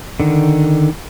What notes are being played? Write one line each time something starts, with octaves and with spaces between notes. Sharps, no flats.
D3 D#3